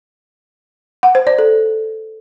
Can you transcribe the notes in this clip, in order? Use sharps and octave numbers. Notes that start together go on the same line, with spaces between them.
F#5
C5
D5
A4